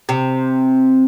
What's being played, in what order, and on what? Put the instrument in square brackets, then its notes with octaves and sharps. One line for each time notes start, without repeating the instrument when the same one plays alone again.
[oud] C3